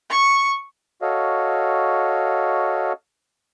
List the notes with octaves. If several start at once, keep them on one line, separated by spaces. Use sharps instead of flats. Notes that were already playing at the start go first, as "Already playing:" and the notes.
C#6
F#4 A4 C#5 D#5 F5